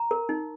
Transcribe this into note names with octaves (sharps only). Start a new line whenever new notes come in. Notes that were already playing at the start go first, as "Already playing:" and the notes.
Already playing: A#5
A#4
D#4